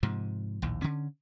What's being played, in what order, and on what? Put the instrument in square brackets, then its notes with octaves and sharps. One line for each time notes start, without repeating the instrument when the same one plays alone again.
[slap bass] G#2 C3 F3
A#1 D#2 A2
D3 C#4